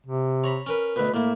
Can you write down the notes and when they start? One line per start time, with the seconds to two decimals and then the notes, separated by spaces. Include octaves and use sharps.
0.06 C3
0.44 C#5 A#5 B5
0.66 C#4 A#4 B4
0.96 D2 B2 B4
1.14 A2 A#3 E4